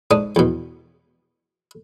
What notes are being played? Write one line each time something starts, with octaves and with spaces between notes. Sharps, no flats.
G#2 D4 D#6
E2 B2